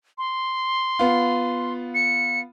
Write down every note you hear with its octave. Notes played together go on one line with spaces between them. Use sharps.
C6
B3 F4
C#7